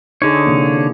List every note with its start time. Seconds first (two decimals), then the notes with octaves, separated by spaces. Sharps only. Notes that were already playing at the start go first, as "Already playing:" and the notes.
0.22 D3 D#4 G#4 C#5
0.46 C3 E3 A#3